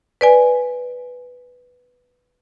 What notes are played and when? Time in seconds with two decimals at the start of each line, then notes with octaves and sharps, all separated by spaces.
0.21 B4 D5 G#5